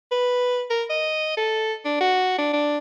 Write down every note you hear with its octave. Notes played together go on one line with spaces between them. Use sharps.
B4
A#4
D#5
A4
D4
F#4
D4
D4